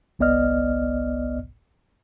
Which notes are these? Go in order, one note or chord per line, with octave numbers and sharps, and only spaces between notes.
G1 C2 B3 D5 D#5 F6